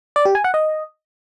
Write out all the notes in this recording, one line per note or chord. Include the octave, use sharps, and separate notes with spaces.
D5
G4
G#5
F#5
D#5